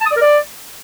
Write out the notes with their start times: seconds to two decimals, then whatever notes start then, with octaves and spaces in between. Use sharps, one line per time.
0.01 A5
0.06 D#6
0.11 D5
0.16 A#4
0.21 D5